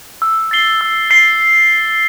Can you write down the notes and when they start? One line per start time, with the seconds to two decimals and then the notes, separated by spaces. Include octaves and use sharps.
0.22 E6
0.51 A6 C7 G7
0.81 E6
1.10 A6 C7 G7